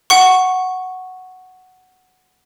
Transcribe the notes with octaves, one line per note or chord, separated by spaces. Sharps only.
F#5 C#6